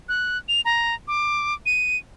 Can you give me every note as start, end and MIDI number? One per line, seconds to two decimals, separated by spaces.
0.09 0.38 90
0.49 0.61 101
0.65 0.95 82
1.08 1.54 86
1.66 1.97 99